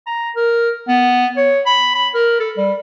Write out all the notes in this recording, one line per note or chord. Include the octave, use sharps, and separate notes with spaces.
A#5
A#4
B3
C#5
B5
B5
A#4
A4
G3